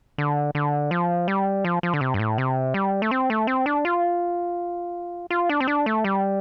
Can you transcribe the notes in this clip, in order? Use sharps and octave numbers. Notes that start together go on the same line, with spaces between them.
D3
D3
F3
G3
F3
F3
D3
C3
G2
A2
C3
G3
A3
C4
A3
C4
D4
F4
F4
D4
C4
D4
A3
G3